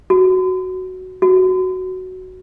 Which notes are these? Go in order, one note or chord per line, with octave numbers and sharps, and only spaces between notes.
F#4
F#4